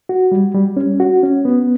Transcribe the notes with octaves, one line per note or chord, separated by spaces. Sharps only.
F#4
G3
G3
C#4
F#4
C#4
B3